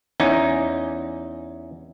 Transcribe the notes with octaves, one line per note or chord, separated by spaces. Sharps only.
E2 C#4 D#4